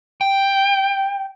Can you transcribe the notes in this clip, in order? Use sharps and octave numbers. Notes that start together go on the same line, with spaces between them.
G5